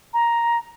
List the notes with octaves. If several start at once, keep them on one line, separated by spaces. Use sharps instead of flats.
A#5